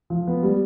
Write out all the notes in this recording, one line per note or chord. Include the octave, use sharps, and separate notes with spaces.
F3
B3
G3